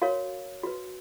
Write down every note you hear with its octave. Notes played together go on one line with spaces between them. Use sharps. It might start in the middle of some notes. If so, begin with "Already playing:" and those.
F#4 A#4 C#5 F5
F#4 B4